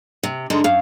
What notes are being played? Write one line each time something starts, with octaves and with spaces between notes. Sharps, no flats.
C3
G#2 D3 G#3
F#2 F5